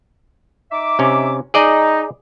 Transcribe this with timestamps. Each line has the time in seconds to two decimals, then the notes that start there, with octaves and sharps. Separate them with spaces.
0.72 D#4 E5 D6
0.99 C3 C#4
1.54 D#4 G#4 D5 D#5